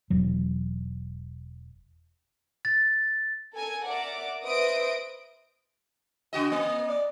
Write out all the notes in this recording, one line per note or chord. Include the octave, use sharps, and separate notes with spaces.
E1 F#3
A6
A4 A#4 G#5
A#4 D5 E5 F#5 D6
B4 C5 D#5 E5 D#6 D7
C#3 F#4 D#5
A#3 D#5
D5